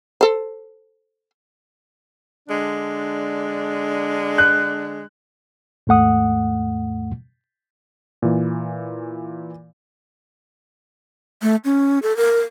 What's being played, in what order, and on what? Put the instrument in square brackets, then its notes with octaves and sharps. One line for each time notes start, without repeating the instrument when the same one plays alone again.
[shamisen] A4 C5
[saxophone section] D3 G#3 D4
[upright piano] F#6
[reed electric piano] D#2 G#2 A3 F#5 D#6
[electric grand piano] A#2 E3
[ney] A3
C#4
A4
A#4